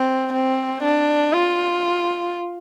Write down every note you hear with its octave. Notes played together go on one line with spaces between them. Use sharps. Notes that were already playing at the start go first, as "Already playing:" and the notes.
Already playing: C4
C4
D4
F4